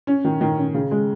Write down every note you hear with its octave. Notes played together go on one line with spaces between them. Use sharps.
C#4
D#3
D#3
C#4
C#3
G#3